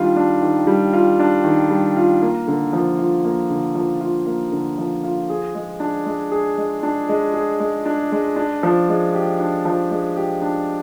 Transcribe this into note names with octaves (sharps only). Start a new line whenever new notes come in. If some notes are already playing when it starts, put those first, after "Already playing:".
Already playing: D#3 G3 D4 F4
D4
D#3
G3
F4
D4
D#3
G3
F4
A#3
D3
F3
F4
A#3
D3
F3
F4
A#3
D3
F3
F4
G#4
G#3
D4
G#3
G#4
G#3
D4
G#3
G#4
G#3
D4
G#3
D4
F3
G#3
G4
D4
F3
G#3
G4
D4